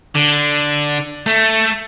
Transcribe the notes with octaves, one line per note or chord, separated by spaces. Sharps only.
D3
A3